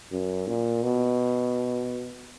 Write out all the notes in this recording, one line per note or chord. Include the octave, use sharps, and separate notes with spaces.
F#2
A#2
B2